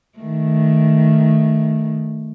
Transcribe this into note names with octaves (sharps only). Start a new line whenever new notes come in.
D#3 A3